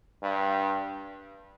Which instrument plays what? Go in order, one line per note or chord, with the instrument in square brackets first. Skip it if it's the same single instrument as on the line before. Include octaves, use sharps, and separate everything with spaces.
[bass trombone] G2